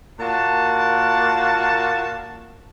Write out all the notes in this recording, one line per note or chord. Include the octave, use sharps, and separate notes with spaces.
A#2 A#3 F#4 A5